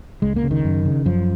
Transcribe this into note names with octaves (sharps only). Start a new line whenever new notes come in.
C#2 G#3
A#3
C#3
D#3
F#2
C#3
F#2 F3